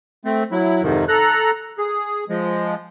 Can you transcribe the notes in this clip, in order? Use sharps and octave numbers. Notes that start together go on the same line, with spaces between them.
A3 C4
F#3 E4
F2 G#2 C3 D#3
A4 A#5 F#6
G#4
F3 G#3